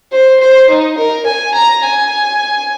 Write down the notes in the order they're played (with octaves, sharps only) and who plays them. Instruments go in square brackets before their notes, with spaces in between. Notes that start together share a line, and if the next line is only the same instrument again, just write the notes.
[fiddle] C5
C5
D#4
A#4
G#5
A#5
G#5